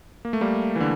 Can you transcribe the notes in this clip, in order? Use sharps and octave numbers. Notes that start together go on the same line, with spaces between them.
A#3
A3
G3 A#3
E3
D3